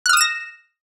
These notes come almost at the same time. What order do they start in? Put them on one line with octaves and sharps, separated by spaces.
F#6 F6 D#6 E7 A#6